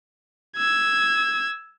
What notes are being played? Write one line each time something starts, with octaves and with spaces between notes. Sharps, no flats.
E6 G#6